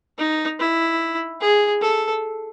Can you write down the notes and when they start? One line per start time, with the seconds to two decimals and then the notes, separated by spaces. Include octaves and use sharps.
0.18 D#4
0.59 E4
1.41 G#4
1.81 A4